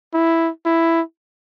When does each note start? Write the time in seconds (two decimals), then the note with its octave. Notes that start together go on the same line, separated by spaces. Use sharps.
0.14 E4
0.66 E4